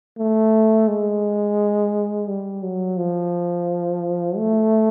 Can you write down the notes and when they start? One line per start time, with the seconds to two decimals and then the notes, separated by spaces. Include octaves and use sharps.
0.18 A3
0.88 G#3
2.28 G3
2.63 F#3
2.97 F3
4.37 A3